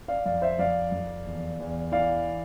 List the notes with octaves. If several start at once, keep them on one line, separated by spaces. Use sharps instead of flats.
D5 F5
F2 D5 F5
C5 E5
F2 D5 F5
F2
E2
E2
E3 D5 F5